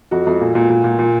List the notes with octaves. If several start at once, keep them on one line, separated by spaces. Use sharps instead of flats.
F2 F#4
F2
A#2
A#2
A#2
A#2
A#2